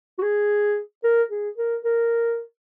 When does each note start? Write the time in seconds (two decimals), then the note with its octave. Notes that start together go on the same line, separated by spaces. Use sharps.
0.19 F#4
0.22 G#4
1.04 A#4
1.31 G#4
1.58 A#4
1.85 A#4